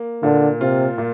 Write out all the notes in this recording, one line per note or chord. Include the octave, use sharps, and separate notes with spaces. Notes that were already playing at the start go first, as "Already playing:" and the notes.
Already playing: A#3
A#2 D3
C3 F4
A#2